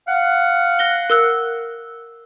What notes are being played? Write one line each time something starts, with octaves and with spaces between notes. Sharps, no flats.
F5 F#5
F#6 A#6 G7
A#4 E6 F#6